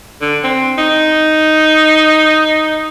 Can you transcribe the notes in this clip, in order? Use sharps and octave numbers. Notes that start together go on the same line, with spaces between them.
D3
C4
D#4